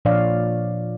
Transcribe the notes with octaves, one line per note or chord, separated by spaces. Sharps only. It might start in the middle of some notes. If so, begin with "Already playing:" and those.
A#2 F3 D4 C#5 D5 F5